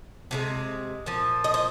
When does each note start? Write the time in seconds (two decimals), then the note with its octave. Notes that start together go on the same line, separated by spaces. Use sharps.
0.31 C3 F3 G#3
1.06 A#2 F3
1.44 D#5
1.54 C5